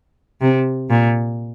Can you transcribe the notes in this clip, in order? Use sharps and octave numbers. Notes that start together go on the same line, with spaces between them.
C3
A#2